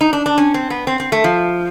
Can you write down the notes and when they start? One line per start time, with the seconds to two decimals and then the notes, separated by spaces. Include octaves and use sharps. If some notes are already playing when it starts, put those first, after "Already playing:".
0.01 D#4
0.13 D4
0.26 D4
0.38 C#4
0.54 C4
0.70 B3
0.87 C4
1.00 C4
1.12 A3
1.24 F3